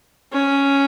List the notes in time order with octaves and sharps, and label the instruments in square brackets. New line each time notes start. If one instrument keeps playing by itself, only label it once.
[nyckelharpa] C#4